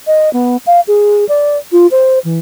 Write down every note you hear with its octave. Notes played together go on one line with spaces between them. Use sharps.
D#5
B3
F5
G#4
D5
F4
C5
E3